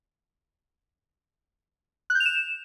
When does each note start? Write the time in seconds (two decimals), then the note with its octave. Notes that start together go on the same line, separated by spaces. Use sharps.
2.10 F#6
2.15 G6
2.20 F7
2.25 E7